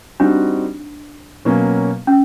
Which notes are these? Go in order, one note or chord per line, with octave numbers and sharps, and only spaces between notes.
G3 C4 D4 D#4 F#4
B2 F#3 A#3 C#4
C#4